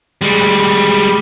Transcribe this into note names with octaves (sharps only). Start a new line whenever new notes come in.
G3 G#3